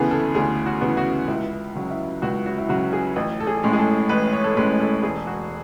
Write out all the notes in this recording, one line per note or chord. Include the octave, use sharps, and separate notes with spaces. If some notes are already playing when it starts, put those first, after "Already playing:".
Already playing: D2 C#3 E3 B3 G#4 A4
A4
D2 G#4
F#4
C#3 E3 B3
F#4
C#2 E4
C#3 F#3
E4
C#2 F#4
F#4
E4
C#3 F#3 F#4
G#4
A1
A4
G#4
A2 G#3 C#4
G#4
A4
A1 B4
C#5
A4
A2 G#3 C#4 B4
A4
E1 G#4
F#4